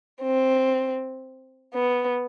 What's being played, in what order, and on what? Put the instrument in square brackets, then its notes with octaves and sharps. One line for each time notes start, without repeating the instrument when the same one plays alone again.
[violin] C4
B3